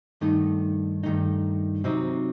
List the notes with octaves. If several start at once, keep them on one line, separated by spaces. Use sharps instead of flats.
G2 D#3 A3 D#4
G2 D#3 A3 D#4
C3 F#3 C4 D#4